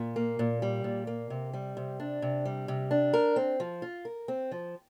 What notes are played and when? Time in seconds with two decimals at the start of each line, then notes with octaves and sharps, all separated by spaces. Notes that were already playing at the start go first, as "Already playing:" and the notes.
Already playing: A#2
0.16 A#3
0.39 A#2
0.62 G3
0.84 A#2
1.07 A#3
1.30 C3
1.53 G3
1.77 C3
2.00 D4
2.22 C3
2.45 G3
2.68 C3
2.91 D4
3.14 A#4
3.36 C4
3.60 F3
3.82 F4
4.05 A#4
4.28 C4
4.52 F3